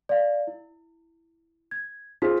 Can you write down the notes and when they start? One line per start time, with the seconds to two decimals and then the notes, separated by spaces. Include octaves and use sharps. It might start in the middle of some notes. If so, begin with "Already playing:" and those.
0.09 D5 F5
0.47 E4
1.71 G#6
2.22 C4 F4 G#4 B6